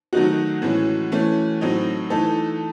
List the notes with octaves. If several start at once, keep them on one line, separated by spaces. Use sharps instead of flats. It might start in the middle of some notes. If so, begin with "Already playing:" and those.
D#3 F#3 A3 D#4 F#4
A2 E3 G#3 C#4
E3 A3 C#4
A2 F#3 C4 D#4
E3 A3 D#4 A4